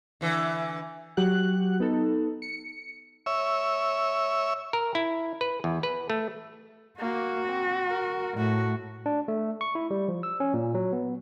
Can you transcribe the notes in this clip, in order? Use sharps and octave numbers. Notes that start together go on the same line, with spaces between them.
D3 E3
F#3 F#4 G4 F#5 F#6
B3 D#4 A4
C#7
C#5 E5
A#4
E4
B4
E2
B4
A3
A#3 F#4
C4
A#4
A2 F#4
D4
A3
C#6
E4
G3
F3
E6
C#4
A#2
F#3
B3